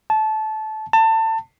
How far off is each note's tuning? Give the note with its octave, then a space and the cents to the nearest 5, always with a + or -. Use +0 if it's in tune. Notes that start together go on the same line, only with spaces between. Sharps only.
A5 -20
A5 +25